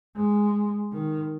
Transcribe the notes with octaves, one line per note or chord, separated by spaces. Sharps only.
G#3
D#3